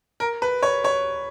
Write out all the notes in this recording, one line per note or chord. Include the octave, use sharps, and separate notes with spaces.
A#4
B4
C#5
C#5